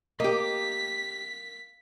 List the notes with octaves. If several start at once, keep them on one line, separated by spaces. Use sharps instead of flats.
A#3 G4 D#5 B6